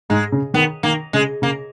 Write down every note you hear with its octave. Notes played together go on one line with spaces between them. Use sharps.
G#2 G#3
C#3
D#3 B3
D#3 A#3
C#3 G#3
C#3 A#3